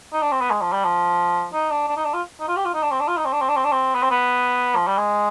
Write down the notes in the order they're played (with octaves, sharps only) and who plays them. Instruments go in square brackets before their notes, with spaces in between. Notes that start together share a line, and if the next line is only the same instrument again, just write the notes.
[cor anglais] D#4
D4
C4
B3
G#3
F3
G3
F3
D#4
D4
D4
D#4
D4
F4
D#4
F4
G4
F4
D#4
D4
C4
D4
F4
D#4
C4
D4
C4
D4
C4
D4
C4
B3
C4
B3
F3
G3
G#3